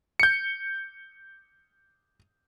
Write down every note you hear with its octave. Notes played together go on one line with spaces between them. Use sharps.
G6 C#7